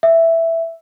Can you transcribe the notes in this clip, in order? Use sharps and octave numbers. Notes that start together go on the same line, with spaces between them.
E5